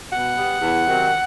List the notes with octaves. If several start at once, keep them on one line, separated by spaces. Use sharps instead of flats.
B2 F#5
G3 B3
E2
C3 D#3 F#3 C4